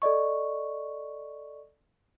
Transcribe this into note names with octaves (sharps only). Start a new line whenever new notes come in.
A4 D5 D#5 C#6